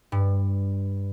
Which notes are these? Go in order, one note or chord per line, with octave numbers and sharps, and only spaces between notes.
G2